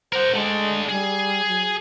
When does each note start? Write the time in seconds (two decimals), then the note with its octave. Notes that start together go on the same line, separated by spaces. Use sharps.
0.13 A#4 C5 F#5
0.35 G#3 A3 D4
0.89 G3 G#4
1.48 F#3